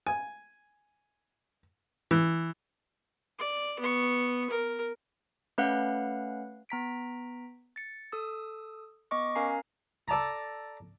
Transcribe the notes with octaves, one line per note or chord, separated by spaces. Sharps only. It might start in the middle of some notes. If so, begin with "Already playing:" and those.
G#5
E3
D5
B3 C#6
A#4
A3 C#4 B4 F5 F#5 F#6
B3 A#5 B6 D7
A6 C#7
A4 D#6 E6
B3 D#5 C#6 D6
C#4 A#4 F5 G#5 A#5 C7
A4 D5 A5 A#5